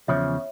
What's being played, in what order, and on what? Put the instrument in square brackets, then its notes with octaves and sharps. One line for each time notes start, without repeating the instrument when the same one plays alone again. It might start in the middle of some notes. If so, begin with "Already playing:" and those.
[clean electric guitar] E2 C#3 F3 [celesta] C#5 E5